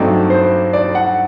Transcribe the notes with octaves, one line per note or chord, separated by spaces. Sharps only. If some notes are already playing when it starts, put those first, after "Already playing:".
Already playing: G2 F#3 A3 C4 D#4 D5
C5
D5
F#5